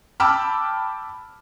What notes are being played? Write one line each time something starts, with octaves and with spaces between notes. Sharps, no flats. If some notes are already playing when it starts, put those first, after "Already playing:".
G5 A5 B5 D6 E6 F6